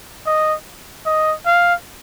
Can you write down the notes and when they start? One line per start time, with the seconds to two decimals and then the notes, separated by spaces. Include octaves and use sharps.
0.27 D#5
1.06 D#5
1.46 F5